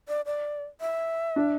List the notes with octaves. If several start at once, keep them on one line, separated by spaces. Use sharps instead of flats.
D5
D5
E5
D4